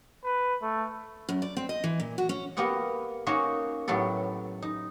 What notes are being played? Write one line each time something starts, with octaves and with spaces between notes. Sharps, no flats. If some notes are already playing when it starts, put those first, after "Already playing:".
B4
A3
F#2
D5
C4
D#5
E3
A#2
F#4
C#4
A#3 B3 G4 D#5 F#5
A#3 C#4 D#4 F#4 C#5
A2 F#3 B3 G4 A4
D#4